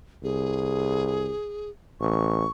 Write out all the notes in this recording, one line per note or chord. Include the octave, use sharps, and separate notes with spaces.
C2 G#4
A1 C#6